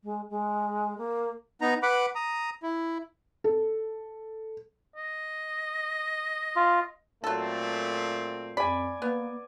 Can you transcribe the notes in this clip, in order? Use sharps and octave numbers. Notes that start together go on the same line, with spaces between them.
G#3
G#3
A#3
B3 D#4 A#5
B4 F#5 B5 D6
A#5 D#6
E4
A4
D#5
F4
A#2 F#3 A3 C4 A4
F2 D5 G#5 B5
A#3 B3